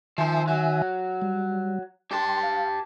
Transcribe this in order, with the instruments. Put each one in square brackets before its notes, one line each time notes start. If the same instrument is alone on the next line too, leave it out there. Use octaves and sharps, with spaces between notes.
[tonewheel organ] D#3 E5 G#5 [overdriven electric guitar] F3 C5
[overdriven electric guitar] F#3
[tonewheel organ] G3
[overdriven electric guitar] G4 A5 [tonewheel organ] G5 C6
[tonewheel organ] F5